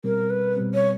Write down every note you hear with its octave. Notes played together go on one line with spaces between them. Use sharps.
B2 G3 C4 A#4
B4
B2 G3 C4
C#5